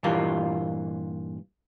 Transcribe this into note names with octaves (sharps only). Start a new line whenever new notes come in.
G2 A#2 E3 A#3 F4